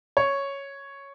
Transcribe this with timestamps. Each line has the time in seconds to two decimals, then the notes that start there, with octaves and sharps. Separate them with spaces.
0.17 C#5